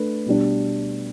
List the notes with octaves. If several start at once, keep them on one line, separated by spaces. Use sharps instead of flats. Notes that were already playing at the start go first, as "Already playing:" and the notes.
Already playing: A3 D4 B4
B2 G3 D4